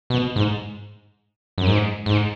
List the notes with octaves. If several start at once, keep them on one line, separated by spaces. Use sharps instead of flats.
B2
G#2
F#2
G#2
G#2